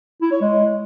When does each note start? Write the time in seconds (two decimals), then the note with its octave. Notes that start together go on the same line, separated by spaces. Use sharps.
0.22 E4
0.31 C#5
0.41 G#3